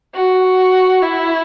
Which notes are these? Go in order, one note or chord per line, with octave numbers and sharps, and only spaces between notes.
F#4
E4